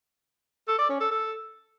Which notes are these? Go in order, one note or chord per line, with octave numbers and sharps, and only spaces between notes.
A4
D5
C#4
A4
A4